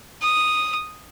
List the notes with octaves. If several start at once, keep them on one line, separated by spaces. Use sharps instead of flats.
D#6